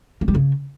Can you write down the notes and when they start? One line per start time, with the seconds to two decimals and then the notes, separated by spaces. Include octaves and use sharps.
0.21 A#3
0.28 G3
0.35 C#3